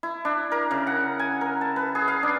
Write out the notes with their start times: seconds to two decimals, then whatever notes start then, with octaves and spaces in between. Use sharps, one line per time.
0.03 E4
0.25 D4
0.52 A#4
0.71 C#3
0.87 F#5
1.19 G#5
1.41 A#4
1.61 A5
1.76 B4
1.95 G#4
2.08 F5
2.23 D4